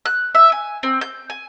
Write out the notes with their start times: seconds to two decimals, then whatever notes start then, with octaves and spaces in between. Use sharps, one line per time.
0.06 F#6
0.35 E5
0.52 G#5
0.83 C4
1.01 G6
1.30 G#5